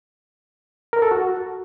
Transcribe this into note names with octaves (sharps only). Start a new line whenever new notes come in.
A#4
A4
F#4